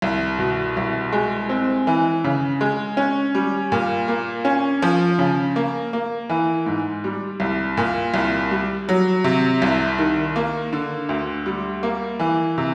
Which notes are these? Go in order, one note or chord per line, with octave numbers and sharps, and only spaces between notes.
C2
B2
C2
G#3
C4
E3
C#3
G#3
C#4
G3
A#2
A#3
C#4
F3
C#3
A#3
A#3
E3
G#2
G3
C2
A#2
C2
G3
F#3
C3
C2
D#3
A#3
D3
D2
G3
A#3
E3
C3